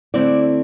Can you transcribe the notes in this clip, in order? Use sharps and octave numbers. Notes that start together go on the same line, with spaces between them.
D3 A3 C4 E4 D5